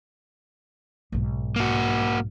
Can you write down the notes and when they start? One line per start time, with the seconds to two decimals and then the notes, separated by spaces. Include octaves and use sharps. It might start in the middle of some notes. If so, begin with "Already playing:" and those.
1.12 B1 G#2
1.56 A#3 F#4